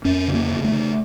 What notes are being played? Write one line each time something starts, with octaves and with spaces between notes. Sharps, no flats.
F2 C#4
C#3
A#3
C#3
A3
C#3